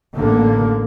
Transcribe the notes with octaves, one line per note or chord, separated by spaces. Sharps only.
A1 D3 A#3